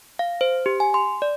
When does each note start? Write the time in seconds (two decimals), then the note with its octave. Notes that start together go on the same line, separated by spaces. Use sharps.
0.19 F5
0.41 C5
0.66 G4
0.80 G#5
0.94 C6
1.22 D5